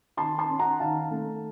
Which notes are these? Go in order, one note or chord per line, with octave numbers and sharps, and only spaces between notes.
D#3 A5 C6
A5 C6
C#4
F#5 A#5
D#3 F5 A5
A3